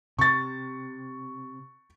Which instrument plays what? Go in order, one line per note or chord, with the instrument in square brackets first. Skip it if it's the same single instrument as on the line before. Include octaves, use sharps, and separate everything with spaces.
[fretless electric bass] C3 [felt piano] C#6 A6